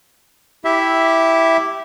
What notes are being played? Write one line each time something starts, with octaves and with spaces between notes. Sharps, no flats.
E4 G4 E5